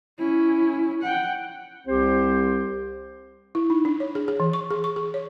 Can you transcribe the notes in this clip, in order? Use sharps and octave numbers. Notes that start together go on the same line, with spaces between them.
C#4 E4
F#5 G5
C2 C4 G4 C5
E4
D#4
D4
C#5
G#4
G#4
E3
C#6
G#4
C#6
G#4
C#5